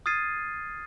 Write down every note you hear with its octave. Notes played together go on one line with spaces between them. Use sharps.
D#6 F6 G#6 A6 C7 D#7